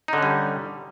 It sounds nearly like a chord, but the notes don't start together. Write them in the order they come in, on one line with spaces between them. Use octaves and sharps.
D#4 D3 C#4 G3